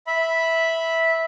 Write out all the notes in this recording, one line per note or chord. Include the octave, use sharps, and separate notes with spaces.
E5 B5